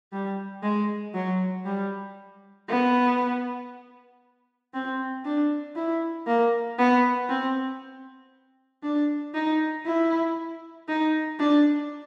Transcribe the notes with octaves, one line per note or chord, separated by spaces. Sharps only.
G3
G#3
F#3
G3
B3
C4
D4
E4
A#3
B3
C4
D4
D#4
E4
D#4
D4